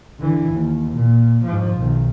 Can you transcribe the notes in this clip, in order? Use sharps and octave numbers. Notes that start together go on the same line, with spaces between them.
D3 E3
D#2
A#2
G#2 F3
B1 D#3